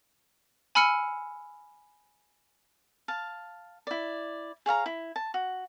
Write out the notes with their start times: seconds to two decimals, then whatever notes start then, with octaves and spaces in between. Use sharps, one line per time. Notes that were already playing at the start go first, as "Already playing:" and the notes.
0.75 G#5 B5 E6 F6 C#7 G7
3.08 F5 A5
3.87 E4 D5
4.66 G#4 C#5 F5 A#5
4.86 E4
5.16 A5
5.34 F#4